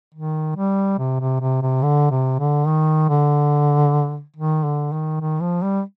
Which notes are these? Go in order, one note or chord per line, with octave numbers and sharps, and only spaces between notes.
D#3
G3
C3
C3
C3
C3
D3
C3
D3
D#3
D3
D#3
D3
D#3
D#3
F3
G3